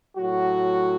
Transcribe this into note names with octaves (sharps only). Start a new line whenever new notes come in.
A2 F#3 F#4